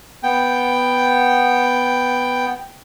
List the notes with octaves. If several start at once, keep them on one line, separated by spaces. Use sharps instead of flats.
B3 G5